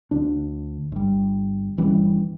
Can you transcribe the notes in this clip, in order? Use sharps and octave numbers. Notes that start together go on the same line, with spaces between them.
D2 D4
G1 G3
G1 E3 G3 C#4